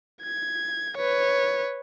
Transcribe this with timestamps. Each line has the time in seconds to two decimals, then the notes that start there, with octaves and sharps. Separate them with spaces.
0.22 G#6
0.97 B4 C#5